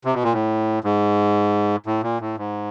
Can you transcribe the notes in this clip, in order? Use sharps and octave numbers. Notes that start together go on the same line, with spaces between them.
C3
B2
A#2
A2
G#2
A2
A#2
A2
G#2